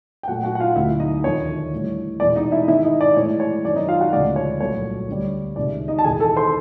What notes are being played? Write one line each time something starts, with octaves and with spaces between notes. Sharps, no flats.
G5
A#2 F#3 A3 F#4 F#5
F#4 F#5
F#5
F4 F5
D2 D3 F#3 E4 E5
D#4 D#5
D#2 D3 F3 C#5
A2 E3 G3
E2 B2 G#3 D5
D#4 D#5
E4 E5
G#2 D#3 G#3 E4 E5
D#4 D#5
D5
A2 E3 G#3 C#5
C#5
F#2 D#3 F#3 D5
D#4 D#5
F4 F5
F#4 F#5
D2 C#3 F3 G#3 D5
C#5
C2 A#2 F#3 A3 C#5
D2 D3 G3
C#2 C3 D#3 G#3 D5
D#4 D#5
A5
E2 C3 D#3 G#4 G#5
A4 A5
C5 C6